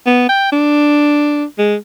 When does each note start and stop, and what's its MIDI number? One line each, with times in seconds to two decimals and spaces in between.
0.06 0.27 59
0.29 0.52 79
0.52 1.44 62
1.58 1.75 56